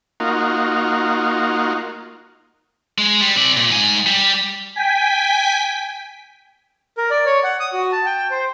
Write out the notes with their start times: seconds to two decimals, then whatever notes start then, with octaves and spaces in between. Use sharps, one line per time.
0.20 A#3 D#4 F4 F#4
2.98 G#3
3.21 G3
3.36 C4 D5
3.57 A#2
3.71 G#2 G#5
4.07 G3 G4
4.75 G5 G#5 B6
6.97 A#4
7.11 D5
7.26 C#5
7.44 F#5
7.60 D#6
7.73 F#4
7.92 A5
8.06 G5
8.31 C5